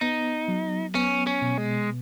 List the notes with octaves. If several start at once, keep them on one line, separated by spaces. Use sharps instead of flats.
B3 D#4
F#3
B3 C#4
C#4
B2
G#3